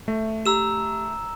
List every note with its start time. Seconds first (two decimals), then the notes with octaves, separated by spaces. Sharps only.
0.08 A3 E5
0.46 G4 A#5 E6 E7